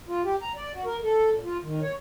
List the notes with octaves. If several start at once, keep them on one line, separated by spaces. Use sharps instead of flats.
F4
G4
A#5
D5
F#4
A#4
A4
A#2
F4
D#3
C#5